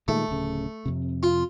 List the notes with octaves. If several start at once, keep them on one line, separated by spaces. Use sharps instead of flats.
A#2 D#3 G#3 A3
D1 C#3
F2 C3
F4